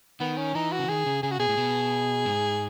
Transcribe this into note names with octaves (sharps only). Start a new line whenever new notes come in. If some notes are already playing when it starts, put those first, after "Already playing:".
D#3 B3
C#4
E3 D#4
F#4
C#3
D#3 G#4
C#3
C#3 G#4
F#4
B2 G#4
A2
B2
G#2